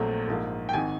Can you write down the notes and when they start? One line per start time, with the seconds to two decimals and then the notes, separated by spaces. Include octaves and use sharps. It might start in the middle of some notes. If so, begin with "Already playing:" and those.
Already playing: A#1 A#2 F#3 A3 C4
0.28 A#1 G#2 F3 A#3
0.69 G5
0.73 G#1 D#3 G#5